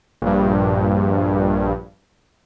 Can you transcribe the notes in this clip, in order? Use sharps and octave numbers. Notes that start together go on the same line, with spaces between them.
A#1 G2